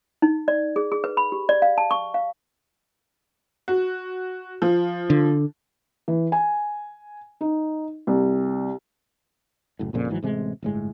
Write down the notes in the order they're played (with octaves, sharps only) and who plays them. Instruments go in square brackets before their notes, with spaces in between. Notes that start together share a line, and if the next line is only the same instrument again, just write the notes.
[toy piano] D#4
D5
G#4
G#4
B4
B5
G4
D5
F5
A5
C#6
F5
[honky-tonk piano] F#4
F3
[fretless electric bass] D3
[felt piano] E3
G#5
D#4
C2
[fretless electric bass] F#1 A2
A#1 F2 A#2 C#3
G#1 G#2 E3 F#3
A1 C3 G#3
G1 A2 G#3